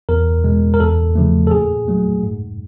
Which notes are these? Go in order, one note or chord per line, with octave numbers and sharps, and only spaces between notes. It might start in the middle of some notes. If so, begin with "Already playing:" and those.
E2 A#4
B2 G#3
A#4
E2 A4
C#3 F3 A3
A4
A#2 G#4
F#3 A3
G#2